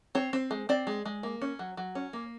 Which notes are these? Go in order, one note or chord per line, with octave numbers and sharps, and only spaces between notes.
C4 C#5
C4
G#3
C4 D5
G#3
G#3
A#3
C#4
F#3
F#3
C#4
A#3